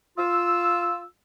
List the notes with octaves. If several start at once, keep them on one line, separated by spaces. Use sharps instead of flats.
F4 E6